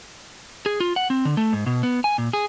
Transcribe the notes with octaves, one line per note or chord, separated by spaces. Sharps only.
G#4
F4
F#5
C4
D3
A3
G#2
B2
B3
G#5
A#2
G#4